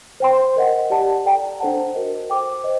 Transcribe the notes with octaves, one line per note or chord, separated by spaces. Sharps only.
C5 G5 C6
A#4 D#5 F#5
G4 D5 F#5 A5
A4 D5 G5 A#5
D4 A4 C5 F#5 A5
F#4 A#4 D#5
A4 C5 G5 D6
C5 D#5